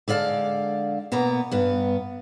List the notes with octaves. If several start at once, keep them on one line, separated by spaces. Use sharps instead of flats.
D3 G#3 D5 F5 A5
B2 A#3 B3 A#4 A#5
G2 B3